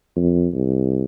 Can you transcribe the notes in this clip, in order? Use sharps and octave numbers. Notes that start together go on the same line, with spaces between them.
F2
C2